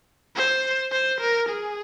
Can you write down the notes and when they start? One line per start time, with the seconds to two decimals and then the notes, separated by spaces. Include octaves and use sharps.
0.36 C5
0.92 C5
1.21 A#4
1.49 G#4